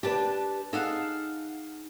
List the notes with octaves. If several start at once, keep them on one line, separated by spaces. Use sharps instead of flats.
D4 G4 B4 D5 A5
D#4 G#4 A4 F5 F#5